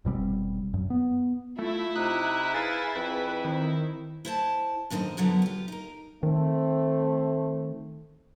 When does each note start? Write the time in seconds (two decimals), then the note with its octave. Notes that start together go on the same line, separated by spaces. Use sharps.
0.05 F1 B2 G3 C4
0.74 F#2
0.90 B3
1.59 A3 E4 F4
1.95 C3 D#4 D#6 F#6
2.54 G#4 B4 F5 G#5 A6
2.96 F2 B4
3.44 D#3 C4
4.25 E4 C5 A5
4.90 F#2 D3 D#3 A4 C5 D#5
5.17 F#2 B2 D3 F#3 B3
5.42 F4 G4
5.68 D#4 A#4
6.23 D#3 A3 C4